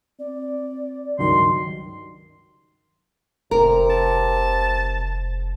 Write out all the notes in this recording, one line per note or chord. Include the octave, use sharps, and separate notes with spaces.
C4 D5
C#2 G2 D#3 F#3 C6
F1 C3 A#4
A5